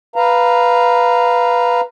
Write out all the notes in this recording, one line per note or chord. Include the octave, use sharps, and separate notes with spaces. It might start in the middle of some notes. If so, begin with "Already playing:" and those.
B4 F5 A#5